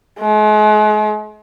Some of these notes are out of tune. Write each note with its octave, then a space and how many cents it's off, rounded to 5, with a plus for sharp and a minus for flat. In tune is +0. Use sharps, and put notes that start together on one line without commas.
G#3 +40